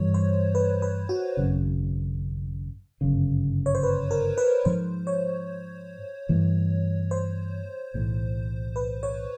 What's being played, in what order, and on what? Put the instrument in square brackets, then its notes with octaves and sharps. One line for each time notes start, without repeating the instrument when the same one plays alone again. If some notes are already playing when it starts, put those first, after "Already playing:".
Already playing: [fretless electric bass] G2 E3 G3 [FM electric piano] C#5
[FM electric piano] C5
B4
B4
F#4
[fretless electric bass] G#1 F#2 C#3
G1 F#2 C#3
[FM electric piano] C#5
C5
B4
A#4
B4
[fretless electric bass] G#2 F3 G#3 [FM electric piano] C5
[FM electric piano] C#5
[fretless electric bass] G2 E3 A3
[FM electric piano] C5
[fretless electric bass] B1 A2 E3
[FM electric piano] B4
C#5